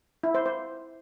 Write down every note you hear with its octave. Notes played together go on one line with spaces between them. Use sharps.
E4
C5
C5